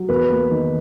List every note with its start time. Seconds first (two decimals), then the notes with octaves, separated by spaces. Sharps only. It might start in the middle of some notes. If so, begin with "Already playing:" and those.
Already playing: F#3
0.09 E2 B4
0.30 A#3
0.51 D#3